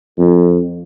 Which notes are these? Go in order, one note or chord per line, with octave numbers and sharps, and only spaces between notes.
F2